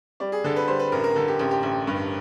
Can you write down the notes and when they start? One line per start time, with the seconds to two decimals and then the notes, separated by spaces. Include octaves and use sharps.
0.20 G3 D5
0.32 G#4
0.44 D3 A4
0.56 B4
0.67 G3 C5
0.79 B4
0.92 A1 A#4
1.04 A#4
1.16 D3 A4
1.28 G4
1.39 A1 G4
1.51 G4
1.63 A1
1.87 G2